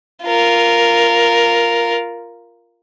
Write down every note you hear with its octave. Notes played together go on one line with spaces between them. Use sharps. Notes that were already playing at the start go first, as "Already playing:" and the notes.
F4 A#4